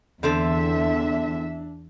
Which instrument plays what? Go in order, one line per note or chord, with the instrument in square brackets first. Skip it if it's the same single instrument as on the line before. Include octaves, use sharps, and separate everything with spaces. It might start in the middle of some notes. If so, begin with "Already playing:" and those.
[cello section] E2 E5 [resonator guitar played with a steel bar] D3 C4 A4 [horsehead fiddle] D4